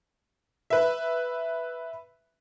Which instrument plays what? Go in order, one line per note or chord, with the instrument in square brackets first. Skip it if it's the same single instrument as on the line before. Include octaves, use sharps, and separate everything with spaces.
[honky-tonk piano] B4 E5